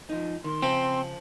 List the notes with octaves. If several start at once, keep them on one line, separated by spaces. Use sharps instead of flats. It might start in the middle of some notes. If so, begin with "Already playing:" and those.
F3 D#4
D#3 C6
C#3 F3 C4